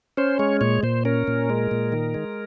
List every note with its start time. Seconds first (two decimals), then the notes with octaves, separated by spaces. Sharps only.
0.17 C#4 C5
0.39 G#3 C#5
0.61 A#2 C#5
0.83 A#2 C5
1.05 C#4 A#4
1.27 A#2
1.50 G#3
1.71 A#2
1.92 D#3
2.14 G#3